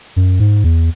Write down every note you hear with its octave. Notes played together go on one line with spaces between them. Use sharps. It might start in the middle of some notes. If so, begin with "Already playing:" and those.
F#2
G#2
E2